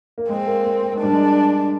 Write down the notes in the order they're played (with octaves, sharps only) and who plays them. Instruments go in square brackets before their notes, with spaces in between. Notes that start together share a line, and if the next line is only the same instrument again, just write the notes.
[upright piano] A#3
[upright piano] G#3 [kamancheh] C4
[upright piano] A#3
A#3
A#3
G#3
[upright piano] G3 [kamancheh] D4
[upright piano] G#3